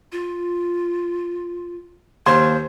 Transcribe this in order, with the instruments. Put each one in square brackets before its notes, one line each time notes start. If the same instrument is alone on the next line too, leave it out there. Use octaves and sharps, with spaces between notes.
[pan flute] F4
[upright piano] D#2 C6 G#6 [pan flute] C5